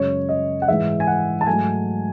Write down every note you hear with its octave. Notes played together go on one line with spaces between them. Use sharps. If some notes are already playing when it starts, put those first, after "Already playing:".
Already playing: F#2 C#3 G#3 C#5
D#5
F#5
G#2 E3 G#3 E5
G#5
F#5
A5
G#2 F#3 A3 G#5